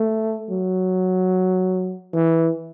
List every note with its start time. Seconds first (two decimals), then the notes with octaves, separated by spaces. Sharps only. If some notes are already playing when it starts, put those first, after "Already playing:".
Already playing: A3
0.50 F#3
2.14 E3